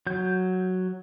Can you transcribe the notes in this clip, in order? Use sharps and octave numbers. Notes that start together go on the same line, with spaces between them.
F#3 G6